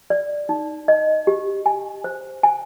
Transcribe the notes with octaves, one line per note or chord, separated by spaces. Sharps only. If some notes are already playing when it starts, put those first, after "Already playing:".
D5
D#4
D#5
G4
G#5
C5
G#5